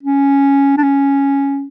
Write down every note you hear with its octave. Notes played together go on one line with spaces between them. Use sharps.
C#4
D4
C#4